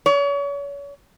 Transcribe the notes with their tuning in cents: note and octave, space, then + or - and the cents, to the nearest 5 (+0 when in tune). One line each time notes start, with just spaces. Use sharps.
C#5 +35